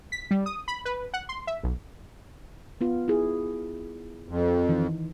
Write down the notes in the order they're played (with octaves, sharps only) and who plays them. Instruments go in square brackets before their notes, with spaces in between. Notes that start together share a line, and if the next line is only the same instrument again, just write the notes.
[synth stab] B6
G3
D#6
B5
B4
F#5
C6
E5
B1
[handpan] B3 F4
E4 G#4
[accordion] F2
[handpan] D#3 E3 D#4